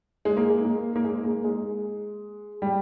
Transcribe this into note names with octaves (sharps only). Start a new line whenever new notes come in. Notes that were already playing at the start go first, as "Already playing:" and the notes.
G#3
A#3
G#3
A#3
A#3
G#3
A#3
G#3
G3